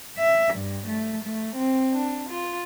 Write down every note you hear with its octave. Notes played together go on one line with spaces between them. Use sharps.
E5
G2
A3
A3
C4
D4
F4